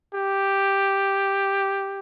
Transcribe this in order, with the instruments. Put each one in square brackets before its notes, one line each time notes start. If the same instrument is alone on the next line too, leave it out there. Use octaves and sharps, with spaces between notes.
[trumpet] G4